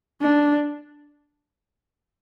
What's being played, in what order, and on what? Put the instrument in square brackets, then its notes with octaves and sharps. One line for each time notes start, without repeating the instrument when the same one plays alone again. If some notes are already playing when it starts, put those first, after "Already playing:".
[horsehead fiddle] D4